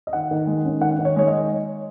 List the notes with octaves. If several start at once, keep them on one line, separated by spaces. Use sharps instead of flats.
D#5
D#3 F#5
D#3
G#3
C#4
D#3 F#5
D#3
C#5
G#3 C#5
D#5